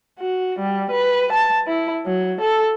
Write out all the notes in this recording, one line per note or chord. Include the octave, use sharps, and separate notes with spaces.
F#4
G3
B4
A5
E4
F#3
A4